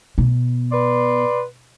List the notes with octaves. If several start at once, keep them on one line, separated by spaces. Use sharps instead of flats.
B2
B4 D5 C6